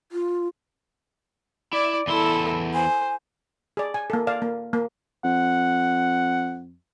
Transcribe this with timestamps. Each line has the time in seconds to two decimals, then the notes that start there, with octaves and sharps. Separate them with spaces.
0.12 F4
1.73 E4 D5
2.07 E2 E4 A4 C6
2.74 C5 G#5
3.77 G#4 D5
3.94 G#5
4.10 A#3 A4
4.27 D5 F5
4.42 A#3
4.73 A#3
5.24 F2 F#5